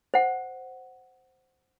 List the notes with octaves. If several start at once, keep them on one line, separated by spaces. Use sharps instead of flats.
C5 F#5